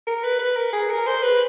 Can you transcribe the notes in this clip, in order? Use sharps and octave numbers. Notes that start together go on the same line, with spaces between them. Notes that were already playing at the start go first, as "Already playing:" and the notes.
A#4
B4
B4
A#4
G#4
A#4
C5
B4